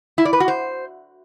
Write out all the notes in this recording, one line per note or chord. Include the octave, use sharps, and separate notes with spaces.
E4
D5
B4
F#4
C5